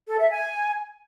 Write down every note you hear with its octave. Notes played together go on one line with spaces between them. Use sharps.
A4
E5
G#5